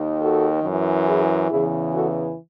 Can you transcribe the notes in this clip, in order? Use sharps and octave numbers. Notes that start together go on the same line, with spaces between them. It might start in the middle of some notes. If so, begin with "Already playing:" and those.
Already playing: D#2 D#3
F#4 A4
F#2 E3
E4 G#4
E2 C#3 E3 E4 G#4
F#4 A4